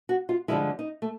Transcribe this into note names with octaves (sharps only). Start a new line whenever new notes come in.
F#4
F4
G2 D3 F3 G#3 E4
D#4
A3